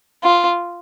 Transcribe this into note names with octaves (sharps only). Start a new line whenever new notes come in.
F4